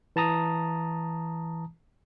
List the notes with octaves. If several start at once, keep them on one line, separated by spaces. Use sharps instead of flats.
E3 A5 A#5 D#6